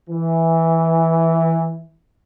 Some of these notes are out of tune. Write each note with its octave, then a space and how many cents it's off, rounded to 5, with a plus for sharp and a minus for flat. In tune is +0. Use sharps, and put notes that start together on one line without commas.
E3 -5